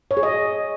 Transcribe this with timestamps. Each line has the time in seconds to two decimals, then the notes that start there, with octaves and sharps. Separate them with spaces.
0.11 C#5
0.17 G#4
0.23 D#5